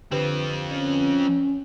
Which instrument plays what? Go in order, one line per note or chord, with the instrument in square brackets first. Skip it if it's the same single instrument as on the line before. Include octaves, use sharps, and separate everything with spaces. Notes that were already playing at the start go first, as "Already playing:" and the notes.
[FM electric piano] D3 G4 B4 [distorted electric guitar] F3 C4
[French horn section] C#4